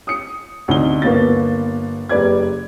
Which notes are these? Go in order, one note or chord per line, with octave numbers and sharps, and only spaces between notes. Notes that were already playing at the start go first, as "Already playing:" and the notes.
D#6 C#7
D2 C3 C#4 D#4 G7
G1 A#3 B3 A6
F#1 G4 B4 D5 G#6